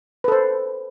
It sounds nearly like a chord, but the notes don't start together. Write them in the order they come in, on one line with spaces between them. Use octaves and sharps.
B4 A4 C5